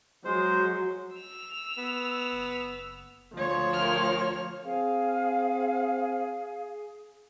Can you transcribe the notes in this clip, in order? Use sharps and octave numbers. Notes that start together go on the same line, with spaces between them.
F#3 G#3 C5
E6 F7
B3
F#1
D2 F3 C#5
A#3 F6
C4 G#4 F5